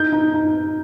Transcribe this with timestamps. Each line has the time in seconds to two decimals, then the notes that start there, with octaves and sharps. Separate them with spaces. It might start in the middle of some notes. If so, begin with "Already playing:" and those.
Already playing: D#4 G6
0.13 D#4
0.34 D#4